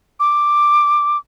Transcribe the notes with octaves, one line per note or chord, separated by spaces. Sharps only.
D6